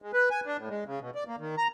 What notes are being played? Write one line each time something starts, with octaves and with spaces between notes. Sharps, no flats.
G#3
B4
G#5
D4
A2
G#3
C#3
B2
D5
A#3
D#3
A#5